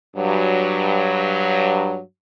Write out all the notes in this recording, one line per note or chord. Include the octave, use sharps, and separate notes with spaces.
G2 F#3